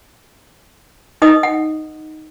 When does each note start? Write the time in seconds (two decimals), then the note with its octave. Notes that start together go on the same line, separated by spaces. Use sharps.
1.22 D#4 B4 D#5 D#6
1.43 F#5